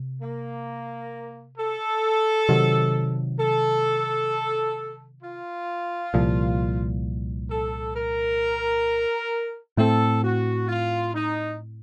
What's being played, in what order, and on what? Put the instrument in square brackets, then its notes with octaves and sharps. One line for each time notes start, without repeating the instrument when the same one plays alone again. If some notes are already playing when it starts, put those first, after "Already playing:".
Already playing: [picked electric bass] C3
[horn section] A#3
A4
[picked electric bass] C3 D#3 F#3
[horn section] A4
F4
[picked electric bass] C2 A#2 F3
[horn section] A4
A#4
[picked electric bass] A2 A3 C4 [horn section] A4
[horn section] F#4
F4
D#4